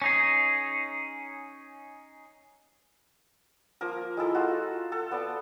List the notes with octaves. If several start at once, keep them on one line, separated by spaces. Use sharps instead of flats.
C#4 D#4 G#4
F3 A#3 A#4
G#3 E4 A4 A#5
F4 F#4
A4
B3 D5 A5